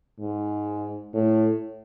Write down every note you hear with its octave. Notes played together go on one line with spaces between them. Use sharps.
G#2
A2